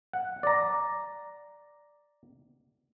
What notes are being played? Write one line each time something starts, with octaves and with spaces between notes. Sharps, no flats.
F#5
D5 A#5